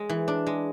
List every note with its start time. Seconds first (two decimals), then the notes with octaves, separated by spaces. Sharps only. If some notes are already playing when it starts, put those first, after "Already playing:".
Already playing: G#3
0.09 E3
0.28 D4
0.46 G#3